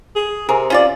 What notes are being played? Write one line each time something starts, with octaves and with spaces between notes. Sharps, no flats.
G#4
C3 G#4 A#4
C#4 F4 D5